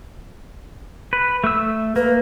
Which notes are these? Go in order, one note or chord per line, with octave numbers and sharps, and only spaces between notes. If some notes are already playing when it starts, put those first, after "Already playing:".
B4
A3 E6
A#3 B4